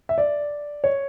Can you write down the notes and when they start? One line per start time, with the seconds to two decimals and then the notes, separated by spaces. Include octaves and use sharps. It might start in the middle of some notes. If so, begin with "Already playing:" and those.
0.09 E5
0.18 D5
0.84 C#5